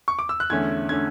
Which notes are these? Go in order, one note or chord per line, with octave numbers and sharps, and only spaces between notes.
C#6
D6
E6
F#6
E2 D3 A3 C#4 G#6
D3 A3 C#4 G#6